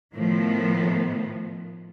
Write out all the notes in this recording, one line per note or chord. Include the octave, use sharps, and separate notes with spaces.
A2 D#3 F3 B3